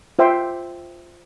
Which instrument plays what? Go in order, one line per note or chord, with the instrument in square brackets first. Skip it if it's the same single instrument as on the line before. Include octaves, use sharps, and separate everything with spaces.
[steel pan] F4 C5 E5 G5 C6